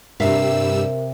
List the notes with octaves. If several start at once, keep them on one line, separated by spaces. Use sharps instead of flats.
G2 C3 G3 A#4 E5 F5 E6